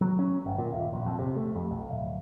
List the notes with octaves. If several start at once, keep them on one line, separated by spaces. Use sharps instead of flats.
F#3
C#4
G1
A#2
D#1
A#1
F2
C3
A3
F2
B1
D1